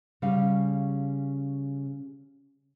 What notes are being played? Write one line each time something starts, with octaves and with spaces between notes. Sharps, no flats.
C#3 G3 C#4 G4 F5